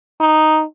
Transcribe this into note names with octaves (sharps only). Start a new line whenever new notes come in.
D#4